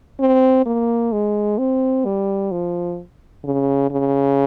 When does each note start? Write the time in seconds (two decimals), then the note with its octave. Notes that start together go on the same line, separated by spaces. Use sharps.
0.20 C4
0.66 A#3
1.13 G#3
1.58 C4
2.05 G3
2.51 F3
3.44 C#3
3.91 C#3